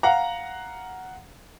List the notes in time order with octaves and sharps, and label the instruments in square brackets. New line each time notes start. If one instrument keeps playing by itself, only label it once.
[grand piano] F5 F#5 A#5